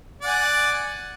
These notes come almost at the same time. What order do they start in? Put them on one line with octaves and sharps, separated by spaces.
D5 F#5 G#5